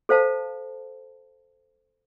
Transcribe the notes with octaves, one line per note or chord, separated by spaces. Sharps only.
A4 C5 F5 A5